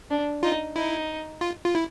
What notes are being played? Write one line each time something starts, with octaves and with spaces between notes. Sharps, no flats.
D4
D#4 F4
D#4 E4
F4
F4
E4